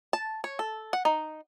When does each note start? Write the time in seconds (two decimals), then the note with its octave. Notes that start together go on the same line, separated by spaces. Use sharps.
0.13 A5
0.44 C#5
0.59 A4
0.93 F#5
1.05 D#4